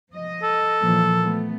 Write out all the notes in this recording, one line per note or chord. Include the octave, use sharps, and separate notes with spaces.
F3 D#5
A4
A#2 E3 F3
A3 B3